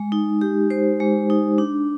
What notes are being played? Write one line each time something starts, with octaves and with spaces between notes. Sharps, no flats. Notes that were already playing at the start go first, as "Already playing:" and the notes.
Already playing: G#3
D#4
G4
C5
G#3
D#4
D4